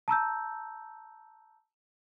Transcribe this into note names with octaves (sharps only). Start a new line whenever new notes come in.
A5 A#5 E6 G6